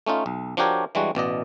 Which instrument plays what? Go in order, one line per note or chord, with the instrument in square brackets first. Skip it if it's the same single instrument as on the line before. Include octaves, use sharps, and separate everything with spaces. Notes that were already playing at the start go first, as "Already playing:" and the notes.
[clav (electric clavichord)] A3 C#4 D#4 F4
B1
F3 D4 F#4 G4 A#4 C#5
E3 G3 G#3 D4 F#4
A1 B2 D5 D#5